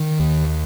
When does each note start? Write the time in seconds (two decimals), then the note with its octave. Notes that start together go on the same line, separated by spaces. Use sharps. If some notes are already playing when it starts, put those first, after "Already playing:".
Already playing: D#3
0.20 D#2